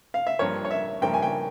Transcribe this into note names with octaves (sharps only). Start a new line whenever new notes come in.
F5
E5
G2 F3 A#3 C#5
C#5
E5
G2 F3 A#3 G5
G#5
G5